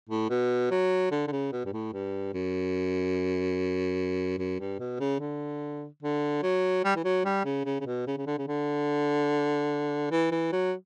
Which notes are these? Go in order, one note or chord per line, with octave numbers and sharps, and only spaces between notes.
A2
B2
F#3
D3
D3
C#3
B2
G2
A2
G2
F#2
F#2
G2
B2
C#3
D3
D3
F#3
G3
E3
F#3
G3
C#3
C#3
C#3
B2
C#3
C#3
D3
C#3
D3
E3
E3
F#3